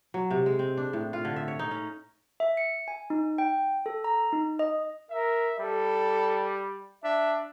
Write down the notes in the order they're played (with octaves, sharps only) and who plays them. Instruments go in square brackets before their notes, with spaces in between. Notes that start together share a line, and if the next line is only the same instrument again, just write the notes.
[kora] F#3
C3
G#3
C4
D4
A2
F4
D3
E5
C#5
D#4
C#4
[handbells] E5
C#7
G#5
D#4
G5
A4
A#5
D#4
D#5
[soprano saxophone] A#4 [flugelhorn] E5
[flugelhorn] G3 [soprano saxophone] A4
[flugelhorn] D4 [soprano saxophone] E5